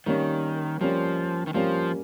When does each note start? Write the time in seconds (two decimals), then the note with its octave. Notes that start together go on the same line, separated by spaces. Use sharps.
0.06 D#3 G3 A#3 C#4
0.81 F3 G3 A#3 C#4
1.47 D#3
1.54 F3 G3 A#3 C#4